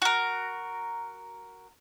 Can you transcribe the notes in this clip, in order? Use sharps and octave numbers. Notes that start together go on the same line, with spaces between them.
F#4 A#4